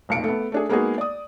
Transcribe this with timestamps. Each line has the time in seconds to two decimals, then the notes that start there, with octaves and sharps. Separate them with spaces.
0.09 F1 B1 A#2 C#7 D7
0.24 A3 B3
0.52 A3 D4 G#4
0.69 G#3 A#3 B3 D#4 F#4 G#4
0.98 D5 D#6